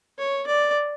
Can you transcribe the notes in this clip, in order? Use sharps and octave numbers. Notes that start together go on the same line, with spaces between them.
C#5
D5